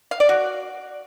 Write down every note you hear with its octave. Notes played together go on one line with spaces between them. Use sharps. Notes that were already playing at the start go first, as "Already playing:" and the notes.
F5
D5
F#4